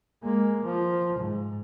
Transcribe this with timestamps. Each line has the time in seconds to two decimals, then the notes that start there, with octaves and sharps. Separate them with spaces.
0.23 G#3 A#3
0.65 F3
1.20 G#2